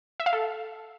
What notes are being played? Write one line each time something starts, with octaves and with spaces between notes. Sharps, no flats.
E5
F5
A4